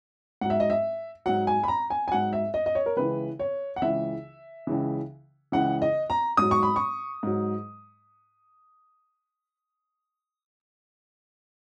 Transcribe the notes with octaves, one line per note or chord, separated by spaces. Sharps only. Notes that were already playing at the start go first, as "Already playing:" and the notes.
G#2 F#3 F#5
E5
D#5
E5
G#2 F#3 F#5
G#5
B5
A#5
G#5
G#5
G#2 F#3 F#5
E5
D#5
D#5
C#5
A#4
C#2 C#3 E3 B4
C#5
F#5
C#2 C#3 E3 E5
C#2 C#3 E3
C#2 C#3 E3 F#5
D#5
A#5
G#2 F#3 D#6
C#6
B5
C#6
G#2 F#3